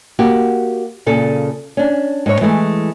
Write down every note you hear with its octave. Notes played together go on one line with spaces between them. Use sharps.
A#3 F#4 G4
A#2 C#3 A4
C#4 D4
G#2 C#5
E3 G#3 A3